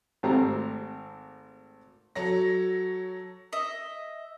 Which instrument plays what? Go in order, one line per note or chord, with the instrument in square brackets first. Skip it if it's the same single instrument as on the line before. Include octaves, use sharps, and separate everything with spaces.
[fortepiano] G#1 A3 C4 G4 A#5
[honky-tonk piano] F#3 A4 C#5 A#6
[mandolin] D#5 E5